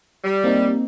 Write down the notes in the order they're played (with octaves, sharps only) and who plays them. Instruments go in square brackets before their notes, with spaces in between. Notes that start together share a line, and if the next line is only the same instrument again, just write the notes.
[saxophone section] G3
[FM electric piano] A#3 C4 D#4